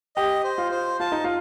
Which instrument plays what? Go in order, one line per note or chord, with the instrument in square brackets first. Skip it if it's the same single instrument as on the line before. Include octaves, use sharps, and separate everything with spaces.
[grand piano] G4 [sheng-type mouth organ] D#5
[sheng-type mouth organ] C5
[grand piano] F4
[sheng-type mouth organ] C5
[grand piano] F4 [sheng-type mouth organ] A5
[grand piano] D#4
F4